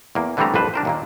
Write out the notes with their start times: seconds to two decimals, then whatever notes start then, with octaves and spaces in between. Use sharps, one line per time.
0.15 E2 A#3
0.37 D3 E3 G3 A3 C4 A#5
0.54 C2 F2 D4 B4 C5
0.74 D4 A#4 C5
0.85 D#2 A#2 A#3